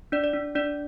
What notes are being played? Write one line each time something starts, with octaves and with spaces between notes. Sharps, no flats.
D4 D5
D5
D4
D4 D5